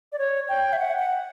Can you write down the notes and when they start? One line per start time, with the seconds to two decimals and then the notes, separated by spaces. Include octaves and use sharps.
0.12 D5
0.19 C#5
0.49 G5
0.73 E5
0.79 F#5
0.99 F#5